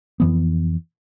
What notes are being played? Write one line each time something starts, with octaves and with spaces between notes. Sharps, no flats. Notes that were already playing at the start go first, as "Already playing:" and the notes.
F2 E3 B3